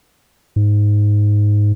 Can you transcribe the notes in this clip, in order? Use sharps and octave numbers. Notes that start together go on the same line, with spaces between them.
G#2